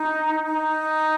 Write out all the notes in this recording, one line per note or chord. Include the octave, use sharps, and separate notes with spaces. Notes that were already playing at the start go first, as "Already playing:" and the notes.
Already playing: D#4
D#4